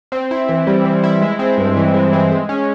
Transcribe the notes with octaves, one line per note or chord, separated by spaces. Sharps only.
C4
E4
E3
G3
C4
E4
G#3
C4
G2
E3
G#3
C4
G#3
C#4